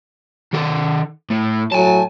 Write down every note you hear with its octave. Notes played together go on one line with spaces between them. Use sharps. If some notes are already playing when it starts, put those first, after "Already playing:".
D#3 A4
A2
A2 F#3 G#5 A5